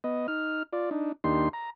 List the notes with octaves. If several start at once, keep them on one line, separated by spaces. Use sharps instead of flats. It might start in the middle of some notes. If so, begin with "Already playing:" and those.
B3 D#5
D#4 F6
F4 D5
D4 D#4
D#2 A#3 D4 D#4 G4 C6
A#5